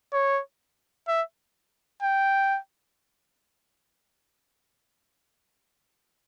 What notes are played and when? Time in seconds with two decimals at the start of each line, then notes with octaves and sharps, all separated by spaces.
0.13 C#5
1.08 E5
2.02 G5